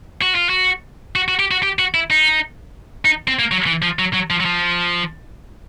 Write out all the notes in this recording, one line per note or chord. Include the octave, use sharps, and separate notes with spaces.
F#4
F4
F#4
F#4
F#4
G4
F#4
G4
F#4
E4
D#4
D#4
C4
A#3
F#3
E3
F3
F#3
F#3
F3
F#3
F3